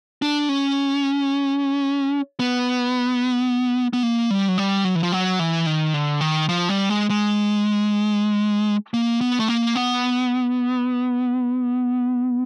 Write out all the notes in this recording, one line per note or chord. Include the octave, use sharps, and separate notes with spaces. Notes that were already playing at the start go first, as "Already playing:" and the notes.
D4
C#4
B3
B3
A#3
G3
F#3
G3
F#3
E3
F3
F#3
E3
D#3
D3
D#3
F3
G3
G#3
G#3
A#3
B3
A3
A#3
B3